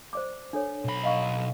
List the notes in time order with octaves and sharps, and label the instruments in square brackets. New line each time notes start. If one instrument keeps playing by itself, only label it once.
[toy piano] C5 D5 D6
D4 A4 C#5
[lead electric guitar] B1 B5
[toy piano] D#5 F5 C#6